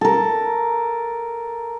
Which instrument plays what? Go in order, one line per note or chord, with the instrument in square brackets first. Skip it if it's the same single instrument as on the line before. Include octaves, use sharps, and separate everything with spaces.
[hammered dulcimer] A4 A#4